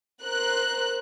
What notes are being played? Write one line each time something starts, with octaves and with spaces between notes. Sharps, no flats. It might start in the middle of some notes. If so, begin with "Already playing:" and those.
A#4 C5 F#6